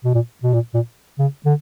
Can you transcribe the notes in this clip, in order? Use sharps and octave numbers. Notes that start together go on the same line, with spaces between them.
B2
A#2
B2
A#2
A#2
C#3
D3